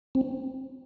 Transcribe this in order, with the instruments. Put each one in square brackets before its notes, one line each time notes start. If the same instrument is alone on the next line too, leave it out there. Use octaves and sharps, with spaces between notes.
[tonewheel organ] C4